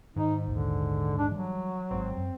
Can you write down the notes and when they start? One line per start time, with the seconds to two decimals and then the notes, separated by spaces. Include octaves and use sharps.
0.16 G#2 D#3 D#4
0.47 A#1 D#2 D3
1.18 D4
1.31 E3 F#3 G3
1.91 G#1 G#2 C4
2.17 F#2